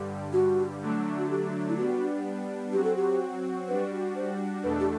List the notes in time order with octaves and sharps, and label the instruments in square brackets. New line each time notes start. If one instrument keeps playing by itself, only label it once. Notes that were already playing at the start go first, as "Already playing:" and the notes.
Already playing: [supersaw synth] G2 D3 G3
[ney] F#4
[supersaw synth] D3 F#3 A3 D4
[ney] F#4
G4
E4
[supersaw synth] G3 B3 D4 [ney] F#4
[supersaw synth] F#3 C4 F#4 [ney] G4
[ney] A4
G4
[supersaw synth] G3 D4 F#4 [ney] B4
[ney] C5
[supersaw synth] E2 B2 A3 D4 A4 [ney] B4
[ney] G4